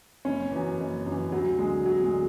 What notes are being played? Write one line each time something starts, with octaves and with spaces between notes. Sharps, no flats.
F#1 C#4
F#2 E3
F#1
F#2 E3
D2 F#3
D3 G#3
D2 F#3
G#3
D3